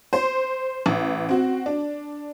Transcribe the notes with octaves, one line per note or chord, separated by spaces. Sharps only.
C5
A1
C4 F#4
D4